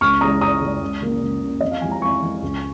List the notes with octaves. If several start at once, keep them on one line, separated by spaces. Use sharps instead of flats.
C#2 C#6 F6
C#3 G#3 A#5 D#6
C#2 A#5 D#6
C#3 G#3
C#2
C#3 A#3
C#2
C#3 A#3
F2 D#5
F5
F3 G#3 G#5
A#5
F2 G#5 C#6
F3 G#3
C#2